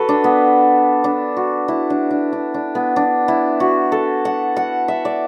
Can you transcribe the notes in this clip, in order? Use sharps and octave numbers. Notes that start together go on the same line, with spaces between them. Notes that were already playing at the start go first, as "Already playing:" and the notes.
Already playing: F#4 A4 B4
D4
B3
D4
F#4
E4
D4
D4
D4
D4
B3
D4
E4
F#4
A4
F#5
F#5
E5
D5